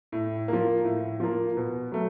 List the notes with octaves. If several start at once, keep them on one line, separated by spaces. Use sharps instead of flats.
A2
F3 A#3
A2
F3 A#3
B2
F#3 A3